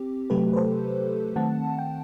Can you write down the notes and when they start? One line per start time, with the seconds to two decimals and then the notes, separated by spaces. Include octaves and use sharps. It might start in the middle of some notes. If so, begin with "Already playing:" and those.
Already playing: C4 G4
0.30 C3 F#3 A3 G4 B4
0.53 B4
0.56 A4 C5
1.36 D#3 A3 C4 F#5 A5
1.78 G5